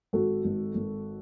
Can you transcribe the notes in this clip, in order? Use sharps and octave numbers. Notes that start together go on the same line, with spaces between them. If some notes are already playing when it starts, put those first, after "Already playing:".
G#1 F#4 A4
G#1
G#1